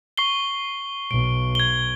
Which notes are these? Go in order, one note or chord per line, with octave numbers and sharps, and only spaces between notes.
C#6 C7 G7
B1 D7
G#6 G7